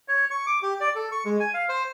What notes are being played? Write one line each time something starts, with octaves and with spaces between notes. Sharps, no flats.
C#5
C#6
D6
G4
D5
A4
C#6
G#3
G#5
F5
C5